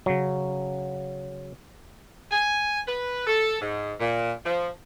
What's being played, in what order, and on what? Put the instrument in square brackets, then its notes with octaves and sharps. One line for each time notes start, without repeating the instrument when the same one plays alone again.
[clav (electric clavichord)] C#3 F#3
[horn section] G#5
B4
A4
G#2
A#2
F3